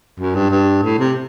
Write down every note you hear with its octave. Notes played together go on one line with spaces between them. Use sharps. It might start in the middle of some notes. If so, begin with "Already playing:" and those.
F#2
G2
G2
A2
C3